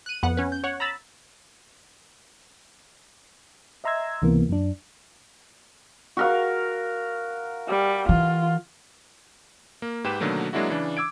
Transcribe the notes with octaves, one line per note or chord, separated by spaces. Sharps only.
F#6 D#7
F2 B3 F#5
C#4 B4
G6
C#5 F#5
A#5 B5 E6 A6
D#5 E5 A#5 C6 E6 G#6
C#2 C3 E3 A#3 B3
F#2 D4
F#4 A#4 F5
G3
E3 F4
A#3
G#2 G4 B4 G5 E7
B2 D3 D#3 F#3 A3 A#3
F#3 G#3 A#3 D4 E4 F#4
C#3 E3 D4
D6 E6 G#6 D7